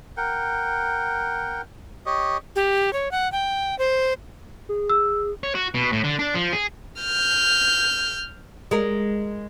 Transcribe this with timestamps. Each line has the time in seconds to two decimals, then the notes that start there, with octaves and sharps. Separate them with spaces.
0.17 A#4 F#5 G5
2.06 G4 C#5 D#5
2.56 G4
2.93 C#5
3.11 F#5
3.32 G5
3.79 C5
4.69 G#4
4.89 E6
5.43 C#5
5.55 F#4
5.74 B2
5.92 A2
6.04 D3
6.19 D4
6.35 F3
6.53 G#4
7.01 F6 G6
8.71 G#3 A#4